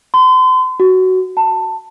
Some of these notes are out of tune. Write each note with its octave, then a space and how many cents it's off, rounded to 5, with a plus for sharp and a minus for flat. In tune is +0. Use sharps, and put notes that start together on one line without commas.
C6 -40
F#4 +10
A5 +15